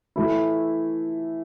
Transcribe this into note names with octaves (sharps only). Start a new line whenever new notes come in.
E3 A3 E4